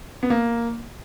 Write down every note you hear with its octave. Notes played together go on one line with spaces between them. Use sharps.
B3
A#3